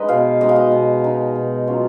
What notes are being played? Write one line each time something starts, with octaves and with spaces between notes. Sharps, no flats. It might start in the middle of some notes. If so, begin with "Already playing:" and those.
Already playing: G#3 D#4 B4 D#5
B2 F5
G#3 D#4 D#5
F5
D#5
B2
G#3 D#4
B2
F#3 C#4 F4